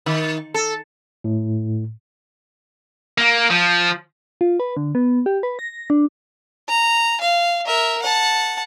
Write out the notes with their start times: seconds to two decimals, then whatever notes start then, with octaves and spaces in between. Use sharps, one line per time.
0.06 D#3
0.54 A4
1.24 A2
3.18 A#3
3.50 F3
4.41 F4
4.60 B4
4.77 D3
4.95 B3
5.26 G4
5.43 B4
5.59 A#6
5.90 D4
6.69 A#5
7.21 F5
7.66 A#4 E5
8.02 F#5 A5